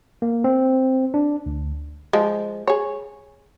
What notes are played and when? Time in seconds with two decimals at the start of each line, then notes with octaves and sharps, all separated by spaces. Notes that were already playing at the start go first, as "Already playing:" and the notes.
0.22 A#3
0.44 C4
1.14 D4
1.46 D2
2.13 F3 G#3
2.67 G#4 C#5